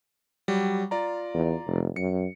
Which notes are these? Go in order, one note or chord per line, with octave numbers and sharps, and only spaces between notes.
F#3 G3
F4 D5 A#5
E2
F1
F#2 C#7